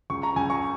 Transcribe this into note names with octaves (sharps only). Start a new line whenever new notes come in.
C#2 C#6
A#5
C#2 G#5
C#6